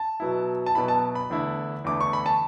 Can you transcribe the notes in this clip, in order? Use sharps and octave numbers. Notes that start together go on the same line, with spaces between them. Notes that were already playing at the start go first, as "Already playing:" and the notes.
Already playing: A5
B2 F#3 B3 E4
A5
B2 F#3 B3 E4 B5
A5
B5
E2 D3 A3 E4
E2 D3 A3 E4 D6
C#6
B5
A5